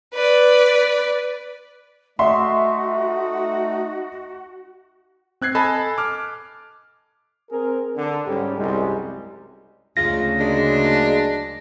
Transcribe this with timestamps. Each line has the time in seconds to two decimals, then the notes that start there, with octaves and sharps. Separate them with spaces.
0.14 B4 D5
2.19 A3 D#4 F#4 D#5 E5 F#5 C6 C#6
5.41 C4 F#6 G#6 C7
5.55 A4 D#5 G#5 A5 B5
5.98 D6 F6
7.51 C4 G#4 A#4
7.96 D3
8.26 G#2 G3 C#4 G4
8.58 C2 F#2 G3 G#3
9.97 D2 C#3 G#3 F4 A#6
10.40 F#3 G#3 A#3 D4